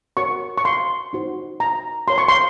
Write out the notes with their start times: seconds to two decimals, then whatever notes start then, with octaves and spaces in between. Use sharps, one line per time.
0.17 F#4 A#4 C#5 C#6
0.58 C#6
0.65 C6
1.13 D#4 F#4 C5
1.60 A#5
2.07 F#4 A#4 C#5 C6
2.18 C#6
2.28 C6